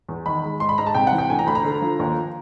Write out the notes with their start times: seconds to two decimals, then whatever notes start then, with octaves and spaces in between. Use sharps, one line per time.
0.08 E2
0.26 D#3 B5
0.44 G#3
0.60 G#2 C6
0.69 B5
0.78 G#2 A#5
0.87 A5
0.95 C3 G5
1.07 F#5
1.12 E3
1.18 G5
1.30 D2 G#5
1.39 A#5
1.46 D2 B5
1.55 A#5
1.65 D3
1.81 F3
1.99 D#2